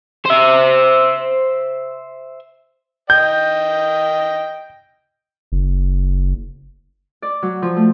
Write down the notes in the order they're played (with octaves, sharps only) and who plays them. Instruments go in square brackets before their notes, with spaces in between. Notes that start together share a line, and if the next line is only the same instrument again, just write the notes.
[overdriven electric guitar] C5 E5
[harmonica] D#5 G5 [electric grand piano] G6
[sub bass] F#1
[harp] D5
F#3
F3
A3